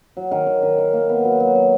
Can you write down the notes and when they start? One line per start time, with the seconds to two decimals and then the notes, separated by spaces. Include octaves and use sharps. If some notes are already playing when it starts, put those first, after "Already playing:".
0.17 F#3
0.31 D#3
0.47 D#3
0.63 D#3
0.78 D#3
0.93 A#3
1.09 B3
1.25 F#3
1.40 F#3
1.55 F#3